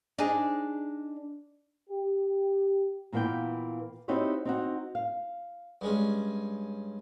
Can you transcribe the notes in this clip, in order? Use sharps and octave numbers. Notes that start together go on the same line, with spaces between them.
D4 D#4 G#4
G4
A#2 E3 A#3 B3 G5
C4 D#4 E4 F#4 G4 C#5
C4 D#4 F#4
F5
G2 G#3 C#4